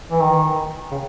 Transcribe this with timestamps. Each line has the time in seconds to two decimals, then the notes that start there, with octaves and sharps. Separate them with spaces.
0.11 E3
0.22 D#3
0.91 C#3